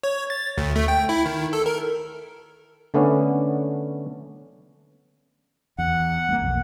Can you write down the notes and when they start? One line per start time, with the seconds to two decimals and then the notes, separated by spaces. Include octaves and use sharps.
0.03 C#5
0.30 A6
0.58 D2
0.76 A3
0.88 G5
1.09 E4
1.26 D#3
1.53 A4
1.66 A#4
2.94 D3 A3 B3 C#4 D4
5.78 E2 F#5
6.29 G3 A3 A#3
6.42 B1 F2